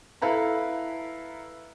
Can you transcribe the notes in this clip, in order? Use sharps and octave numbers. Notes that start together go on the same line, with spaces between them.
E4 A4 B4 F5 A#5